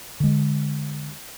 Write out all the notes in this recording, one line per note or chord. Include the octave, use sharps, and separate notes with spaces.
D3 G#3